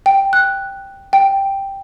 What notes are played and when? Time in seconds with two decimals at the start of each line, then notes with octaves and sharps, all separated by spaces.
0.06 G5
0.33 F#6
1.13 G5